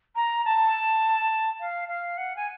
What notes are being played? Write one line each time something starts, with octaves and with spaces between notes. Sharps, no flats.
A#5
A5
F5
F5
F#5
G#5